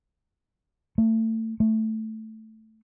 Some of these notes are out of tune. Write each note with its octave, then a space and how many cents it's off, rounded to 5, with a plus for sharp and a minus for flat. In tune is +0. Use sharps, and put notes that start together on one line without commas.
A3 +30
A3 +0